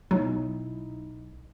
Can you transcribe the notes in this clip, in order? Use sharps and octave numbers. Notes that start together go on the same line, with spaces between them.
B1 F#3 D#4 E4